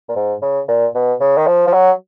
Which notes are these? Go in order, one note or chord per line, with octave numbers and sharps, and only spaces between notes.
A#2
G#2
C#3
A#2
B2
C#3
D#3
F3
F3
F#3